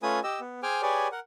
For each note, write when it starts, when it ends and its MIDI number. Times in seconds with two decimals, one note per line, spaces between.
0.03 0.20 57
0.03 0.20 61
0.03 0.20 65
0.03 0.20 71
0.03 0.20 80
0.03 0.20 87
0.24 0.40 67
0.24 0.40 75
0.24 0.40 88
0.40 0.61 59
0.63 0.81 68
0.63 0.81 72
0.63 0.81 79
0.63 0.81 80
0.63 0.81 86
0.63 0.81 89
0.82 1.08 67
0.82 1.08 68
0.82 1.08 71
0.82 1.08 73
0.82 1.08 74
0.82 1.08 80
1.12 1.20 70
1.12 1.20 78